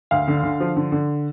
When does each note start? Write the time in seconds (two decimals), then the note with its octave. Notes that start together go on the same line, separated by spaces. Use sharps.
0.11 D2 F5
0.28 D3
0.43 D3
0.60 F3
0.76 D3
0.92 D3